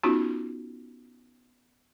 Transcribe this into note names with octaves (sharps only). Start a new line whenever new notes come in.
B3 C#4 D#4 F4 F#4